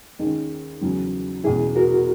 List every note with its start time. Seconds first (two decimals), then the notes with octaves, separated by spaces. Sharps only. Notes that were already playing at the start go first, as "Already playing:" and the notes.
0.19 D#2 D#3 G#3 C#4
0.81 E2 C#3 F#3 C#4
1.44 E2 B2 G#3 C#4 E4 G#4
1.76 F#4 A#4